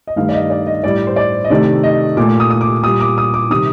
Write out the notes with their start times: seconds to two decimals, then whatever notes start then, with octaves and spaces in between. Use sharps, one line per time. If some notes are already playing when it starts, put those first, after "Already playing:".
0.07 D#5
0.16 G2 D#3 A3 F5
0.29 D5
0.33 D#5
0.50 D5
0.67 D#5
0.84 A2 G3 D5
1.07 C5
1.16 D5
1.44 D#5
1.50 C3 D#3 A3 D5
1.83 D#5
2.17 A#2 A3 D6
2.40 D#6
2.50 D#6
2.61 D6
2.83 A#2 G3 D#6
3.01 D6
3.18 D#6
3.34 D6
3.50 C3 D#3 G3 D#6